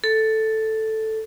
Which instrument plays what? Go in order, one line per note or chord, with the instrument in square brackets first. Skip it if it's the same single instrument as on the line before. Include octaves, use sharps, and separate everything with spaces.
[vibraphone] A4